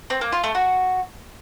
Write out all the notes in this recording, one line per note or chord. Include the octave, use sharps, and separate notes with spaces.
C4
A#3
F4
A3
F#4